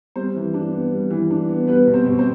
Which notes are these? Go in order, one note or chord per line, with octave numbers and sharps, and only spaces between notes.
G3 C4 C5
E3
D4
B3
G3
E3
D4
B3
G3 B3 B4
B2
C4 C5
B2
C4 C5